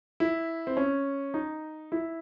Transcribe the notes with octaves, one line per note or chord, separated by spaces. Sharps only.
E4
C4
C#4
D#4
E4